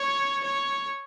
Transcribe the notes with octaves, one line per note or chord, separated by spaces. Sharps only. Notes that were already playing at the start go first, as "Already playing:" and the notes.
Already playing: C#5
C#5